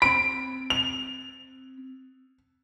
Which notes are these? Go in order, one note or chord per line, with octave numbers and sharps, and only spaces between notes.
C4 B5 D7
F7